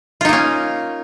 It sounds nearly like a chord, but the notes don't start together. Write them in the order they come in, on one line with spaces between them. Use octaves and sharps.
F4 D#4 A#3 C#4